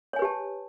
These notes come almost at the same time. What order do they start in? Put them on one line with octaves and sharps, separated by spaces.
C#5 G#5 B4 G4 A5